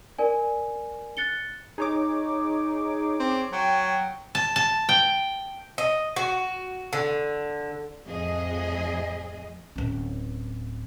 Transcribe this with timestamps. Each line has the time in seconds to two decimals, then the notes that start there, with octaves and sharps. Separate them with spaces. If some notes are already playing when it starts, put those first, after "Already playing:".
0.19 A#4 D5 G#5
1.17 F#6 A6 C#7 G7
1.78 D#4 G#4 C#5 D6
3.20 C4
3.52 F#3 G5
4.35 A5
4.56 A5
4.89 G5
5.78 D#5
6.16 F#4
6.93 D3
8.07 F2 A2 F3 G#4 D#5
9.76 D1 C#4